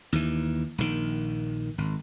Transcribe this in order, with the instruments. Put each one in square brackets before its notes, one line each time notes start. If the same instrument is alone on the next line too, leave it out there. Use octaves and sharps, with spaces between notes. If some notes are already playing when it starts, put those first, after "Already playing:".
[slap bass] D#2 E3
A#1 D#3
G#1